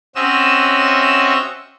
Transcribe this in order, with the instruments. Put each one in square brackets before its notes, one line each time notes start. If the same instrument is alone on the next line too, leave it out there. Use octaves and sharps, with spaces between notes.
[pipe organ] C4 C#4 F#4 D#5 E5 E6